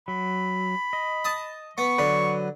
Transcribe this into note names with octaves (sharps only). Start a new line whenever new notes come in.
F#3 B5
D#5
A5 D#6
B3 C#6
D3 F#3 B4